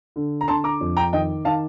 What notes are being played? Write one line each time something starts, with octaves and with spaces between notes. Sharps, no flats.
D3
A#5
D3 A5 C6
A#5 D6
F2
G5 A#5
D#3 D#5 G5
D#3 F5 A5